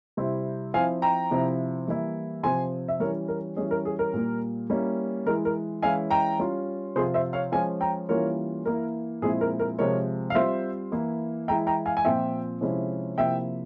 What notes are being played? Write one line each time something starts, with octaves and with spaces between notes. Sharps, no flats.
C3 G3 C4 E4
F3 C4 E4 F5 G#5
G5 A#5
C3 F3 C4 E4
E3 G3 A#3 E4
C3 F3 C4 G#5 C6
E5
E3 G3 C#4 A#4 C#5
A#4
E3 G3 C#4 G#4
A#4
G#4
A#4
A#2 G3 A#3
G3 A#3 C#4 E4
E3 G#3 E4 A#4
A#4
E3 G#3 C#4 E4 F5 G#5
G5 A#5
G3 C#4 F4
C3 F3 C4 F4 G#4 C5
C5 E5
C#5 F5
F3 G#3 C#4 F5 G#5
G5 A#5
E3 G3 A#3 C#4 F4 A#4 C#5
E3 A#3 E4 A#4
A#2 F3 G#3 C4 E4 G#4
A#4
A#4
C3 F3 G#3 A#4 C#5
F5
G3 C4 F4 C5 E5
E3 A#3 E4
E3 G#3 E4 G5 A#5
G5 A#5
F5 G#5
G#5
A#2 F3 C4 F4 E5 G5
C3 F3 G#3 C#4 E4
C3 F3 A#3 E4 E5 G5